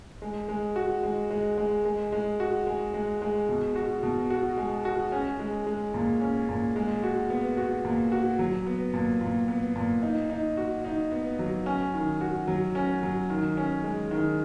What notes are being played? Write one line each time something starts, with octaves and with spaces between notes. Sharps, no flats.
G#3
G#3
F#4
G#3
G#3
G#3
G#3
G#3
F#4
G#3
G#3
G#3
B2
F#4
B2
F#4
G#3
F#4
C#4
G#3
G#3
A#2
C#4
A#2
G#3
F#4
B3
F#4
A#2
F#4
F#3
B3
A#2
A#2
B3
A#2
D#4
D#4
F#4
D#4
B3
F#3
C#4
D#3
F#4
F#3
C#4
F#3
D#3
C#4
G#3
D#3